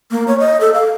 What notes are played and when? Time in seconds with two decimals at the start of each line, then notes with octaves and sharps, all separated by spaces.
0.11 A#3
0.28 C#5
0.40 D#5
0.61 A4
0.74 F5